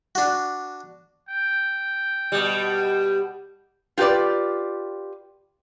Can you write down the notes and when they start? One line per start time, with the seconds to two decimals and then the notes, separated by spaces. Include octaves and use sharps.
0.15 D4 F#4
1.29 G5
2.32 B2 G3
3.98 F4 G4 A4 B4 D5